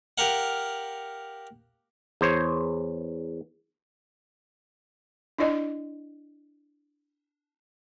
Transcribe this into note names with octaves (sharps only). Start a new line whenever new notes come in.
G4 A#4 F5 F#5
E2 C5 C#5
D4 E4 D5 D#5